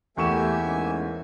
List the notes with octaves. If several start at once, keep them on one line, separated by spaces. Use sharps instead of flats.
E2 A3 A#3 G4 E5 G#5 C#6 E7
G#2 C#3 A3